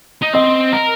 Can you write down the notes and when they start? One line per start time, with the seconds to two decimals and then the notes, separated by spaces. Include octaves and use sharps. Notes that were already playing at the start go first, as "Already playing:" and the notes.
0.22 D#4
0.34 C4 D#5
0.73 A#4